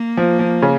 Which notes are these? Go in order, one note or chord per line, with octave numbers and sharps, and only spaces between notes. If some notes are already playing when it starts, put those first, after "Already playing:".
Already playing: A#3
F3
F3
C#3